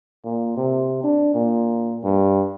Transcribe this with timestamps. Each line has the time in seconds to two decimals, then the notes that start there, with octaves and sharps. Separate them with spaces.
0.24 A#2
0.57 C3
1.04 D4
1.34 A#2
2.04 G2